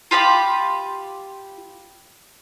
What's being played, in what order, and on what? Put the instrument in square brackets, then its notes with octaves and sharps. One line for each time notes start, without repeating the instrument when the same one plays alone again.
[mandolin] F4 G4 B5 D6